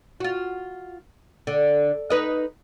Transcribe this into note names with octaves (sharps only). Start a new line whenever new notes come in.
F4 F#4
D3
D#4 B4 D#5